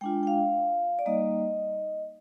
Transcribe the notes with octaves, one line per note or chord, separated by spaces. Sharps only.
G#3 D4 F4 G5
G5
F5
D5
G3 A#3 D#4 D#5